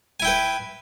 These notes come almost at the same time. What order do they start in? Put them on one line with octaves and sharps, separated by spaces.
G#5 E4 G5 B4